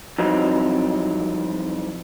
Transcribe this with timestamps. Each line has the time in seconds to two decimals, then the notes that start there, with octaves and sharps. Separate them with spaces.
0.18 F2 E3 F#3 G3 C4 D#4